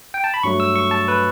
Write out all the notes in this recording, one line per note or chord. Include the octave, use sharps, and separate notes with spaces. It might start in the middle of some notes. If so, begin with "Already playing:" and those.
G5
A5
B5
G2 F#3 A3 C#6
E6
C#6
A5
B4